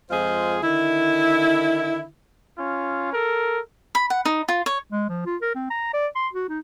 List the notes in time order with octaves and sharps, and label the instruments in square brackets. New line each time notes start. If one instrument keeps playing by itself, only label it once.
[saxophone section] F2 G#3 F4 G#4 C5
D3 D#3 E4
[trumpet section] C#4 F4
A4 A#4
[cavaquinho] B5
F#5
D#4
F4
C#5
[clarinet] G#3
F3
F4
A#4
C4
A#5
D5
C6
F#4
D#4